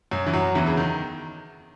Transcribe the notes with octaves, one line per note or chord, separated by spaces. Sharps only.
F#2 F#3
E3
F#2 F#3
E2 E3
C#3
D#3